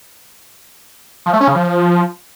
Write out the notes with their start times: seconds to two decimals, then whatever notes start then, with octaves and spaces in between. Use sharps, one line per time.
1.26 F3
1.33 A3
1.41 C#4
1.48 C#3
1.55 F3